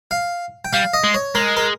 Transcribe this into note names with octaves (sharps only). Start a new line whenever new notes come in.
F5
G5
G3 F5
D#5
G#3
C#5
G#3 A#4
A#4